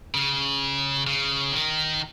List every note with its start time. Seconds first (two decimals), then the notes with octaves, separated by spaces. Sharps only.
0.15 C#3
1.07 C#3
1.52 D#3